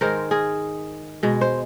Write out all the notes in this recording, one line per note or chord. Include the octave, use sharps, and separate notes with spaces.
G#2 D#3 G#3 A#4 C5
G#4 A#4
B2 G#3
C5